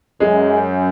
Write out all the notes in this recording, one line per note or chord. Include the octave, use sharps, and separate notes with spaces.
F#2 G#3